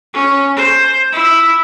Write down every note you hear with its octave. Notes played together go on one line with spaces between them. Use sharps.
C#4
C5
E4